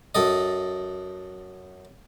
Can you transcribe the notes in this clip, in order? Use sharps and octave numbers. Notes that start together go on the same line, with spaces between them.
F#2 A4 D#5